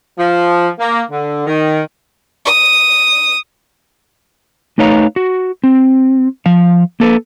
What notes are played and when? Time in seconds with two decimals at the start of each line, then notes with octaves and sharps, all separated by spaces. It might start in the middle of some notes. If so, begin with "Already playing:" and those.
0.18 F3
0.80 A#3
1.11 D3
1.47 D#3
2.45 D#6
4.78 A3 D#4 B4 C#5 F5 A#5
5.16 F#4
5.64 C4
6.46 F3 F5
7.00 A#3 A4 B4